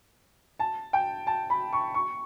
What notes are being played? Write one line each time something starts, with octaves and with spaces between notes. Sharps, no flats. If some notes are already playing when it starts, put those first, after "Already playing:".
A5
G5
A5
B5
C#6
C#6